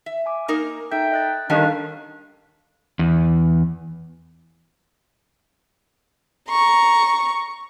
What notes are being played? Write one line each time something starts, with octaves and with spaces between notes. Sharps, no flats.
E5
G#5 D6
A#3 D#4 A#4
D#4 A4 E5 G5 G6
D#5 F#6 A6
D#3 G3 C#4 D4 A4 F5 F#6
E2
A#5 C#6